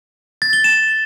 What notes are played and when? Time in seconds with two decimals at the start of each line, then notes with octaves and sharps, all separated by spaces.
0.42 A6
0.53 G7
0.64 E7